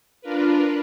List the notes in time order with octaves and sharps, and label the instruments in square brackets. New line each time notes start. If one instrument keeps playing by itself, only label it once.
[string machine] D4 F4 A#4 B4